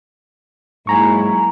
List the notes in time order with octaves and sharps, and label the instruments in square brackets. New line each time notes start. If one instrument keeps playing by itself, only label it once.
[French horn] G#2 [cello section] F#3 A#3 E4 [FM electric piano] G#5 A#5 C#6